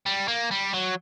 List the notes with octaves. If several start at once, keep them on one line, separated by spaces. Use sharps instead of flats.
G3
A#3
G3
F#3